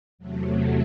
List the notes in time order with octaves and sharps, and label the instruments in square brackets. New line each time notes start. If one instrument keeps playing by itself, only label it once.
[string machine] E2 C3 F#3 A3